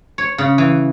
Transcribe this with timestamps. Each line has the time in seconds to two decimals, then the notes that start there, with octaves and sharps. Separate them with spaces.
0.18 C#5
0.38 C#3
0.58 E3